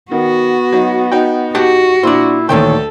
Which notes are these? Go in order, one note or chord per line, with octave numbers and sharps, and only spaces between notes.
D#3 B3 F#4
F#3 D#4
D#4 F#4 G5
D#4 F#4 G4 F#5 A5
A#2 D4 E4 C5
D2 A#2 D#3 E3 A4 C#5 G5